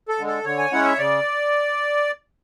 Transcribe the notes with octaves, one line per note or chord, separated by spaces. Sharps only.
A4
D3 G#3
A4
D3 C#5
G#5
G#3 C#4 E4 F#5
E5
C#3 D5